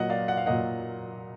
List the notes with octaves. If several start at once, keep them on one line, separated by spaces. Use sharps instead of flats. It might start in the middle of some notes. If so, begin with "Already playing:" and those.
Already playing: A#2 F#3 A#3 D#5 F#5
D5 F5
F#5
F5
A#2 F#3 A#3 D#5 F#5